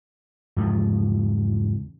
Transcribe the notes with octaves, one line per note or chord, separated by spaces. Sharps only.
E2 G#2 C#3 F3